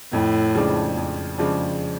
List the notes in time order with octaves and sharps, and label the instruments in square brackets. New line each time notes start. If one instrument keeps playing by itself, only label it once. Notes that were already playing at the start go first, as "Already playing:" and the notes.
[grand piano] F2 [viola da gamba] A2
[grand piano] C#3 F3 G#3 D4
F2
C#3 F3 G#3 D4